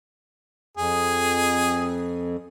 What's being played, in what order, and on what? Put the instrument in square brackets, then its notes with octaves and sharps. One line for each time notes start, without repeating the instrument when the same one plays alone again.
[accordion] F2 [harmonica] G#4